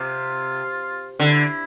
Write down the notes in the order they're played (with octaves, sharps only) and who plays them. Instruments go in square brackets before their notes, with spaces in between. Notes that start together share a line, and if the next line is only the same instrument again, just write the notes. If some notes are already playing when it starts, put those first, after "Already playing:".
Already playing: [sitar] C3 [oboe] F4
[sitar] D3 [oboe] E4